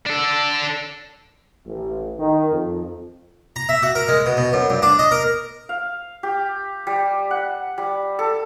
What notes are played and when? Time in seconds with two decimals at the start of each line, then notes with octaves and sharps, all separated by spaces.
0.06 D4 A4
1.66 A1
2.19 D#3
2.52 F2
3.56 A#5
3.69 E5
3.83 F#4
3.95 A#4
4.08 G#3
4.26 B2
4.37 B2
4.53 F#2
4.70 G2
4.82 D4
4.99 D#5
5.11 A#4
5.69 F5
6.23 G4
6.87 G3
7.31 F#5
7.78 G3
8.19 A4